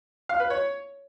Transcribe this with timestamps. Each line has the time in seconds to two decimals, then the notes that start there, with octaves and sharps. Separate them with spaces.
0.29 F5
0.40 B4
0.50 C#5